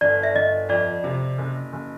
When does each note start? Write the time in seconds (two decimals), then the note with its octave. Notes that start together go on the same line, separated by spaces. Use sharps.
0.01 G1 D5
0.23 E5
0.35 G1 D#5
0.69 F2 D5
1.04 C3
1.38 F#1
1.73 F#1